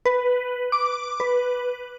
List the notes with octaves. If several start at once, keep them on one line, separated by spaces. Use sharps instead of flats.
B4
D6
B4